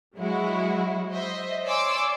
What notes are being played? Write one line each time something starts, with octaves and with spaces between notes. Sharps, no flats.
F#3 G#3 E4 F#4
C5 D#5 E5
C#5 D5 G#5 C6 D6 E6